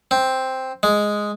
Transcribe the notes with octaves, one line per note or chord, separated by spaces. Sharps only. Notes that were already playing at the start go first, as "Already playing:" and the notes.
C4
G#3